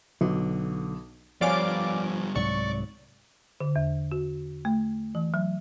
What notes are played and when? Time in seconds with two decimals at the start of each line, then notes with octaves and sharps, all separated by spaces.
0.21 B1 D3
1.41 F3 G3 B3 C#5 D5 F5 G#5 D6
2.36 C2 G#2 F#3 D5 C#6
3.60 D3
3.76 E2
4.12 F#4
4.65 A3
5.15 E3
5.34 F#3